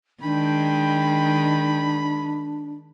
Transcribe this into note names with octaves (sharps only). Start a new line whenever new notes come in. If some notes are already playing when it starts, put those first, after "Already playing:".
D#3 G#3 D4 G5 B5